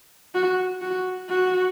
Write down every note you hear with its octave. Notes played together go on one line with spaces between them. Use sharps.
F#4
F#4
F#4